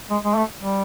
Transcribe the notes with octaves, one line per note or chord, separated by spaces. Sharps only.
G#3
G#3
A3
G3